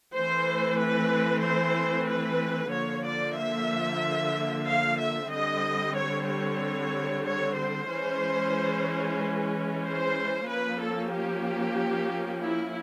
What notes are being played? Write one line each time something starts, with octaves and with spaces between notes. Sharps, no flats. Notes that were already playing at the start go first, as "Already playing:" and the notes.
E3 A3 C4 C5
B4
C5
B4
D3 F3 A#3 C#5
D5
E5
F5
E5
D3 G3 C4 D#5
C#5
C#5
C#5
C5
E3 G#3 C#4
C5
F3 A#3 C#4 B4
A4
G4
E4